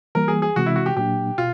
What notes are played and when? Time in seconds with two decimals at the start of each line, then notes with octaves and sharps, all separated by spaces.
0.15 E3 G3 A#3 A#4
0.28 G#4
0.42 G#4
0.56 C3 E3 G#3 C4 F#4
0.66 E4
0.76 F#4
0.86 G4
0.96 A#2 F#3 A#3 D4 G4
1.38 B2 F4